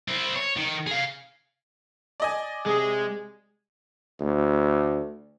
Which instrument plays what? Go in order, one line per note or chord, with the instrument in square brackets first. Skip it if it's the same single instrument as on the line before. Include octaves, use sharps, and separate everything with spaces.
[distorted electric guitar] C4 E4
C#5
D#3
G#4 F5
[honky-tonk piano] D5 D#5 G#5
[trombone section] C3 G#4 [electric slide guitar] G#3
[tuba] D2